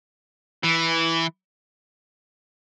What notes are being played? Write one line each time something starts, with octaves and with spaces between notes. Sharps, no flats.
E3